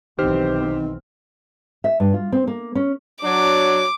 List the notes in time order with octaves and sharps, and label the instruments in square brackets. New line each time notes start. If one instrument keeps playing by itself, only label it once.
[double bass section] B1 E3 C4 [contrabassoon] D#3 [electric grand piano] G4 C5 F6
[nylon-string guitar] E5
G2
F4
C4
A#3
C#4
[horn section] F#3 D4 [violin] D6